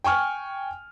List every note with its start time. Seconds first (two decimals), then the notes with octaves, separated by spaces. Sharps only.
0.04 G5 G#5 C#6 F6